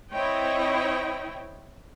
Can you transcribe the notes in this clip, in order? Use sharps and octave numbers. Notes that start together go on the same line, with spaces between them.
C4 E4 C#5 D#5 G5